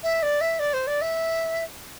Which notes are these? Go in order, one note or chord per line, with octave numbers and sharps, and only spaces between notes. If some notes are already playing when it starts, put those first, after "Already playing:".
E5
D5
E5
D5
C5
D5
E5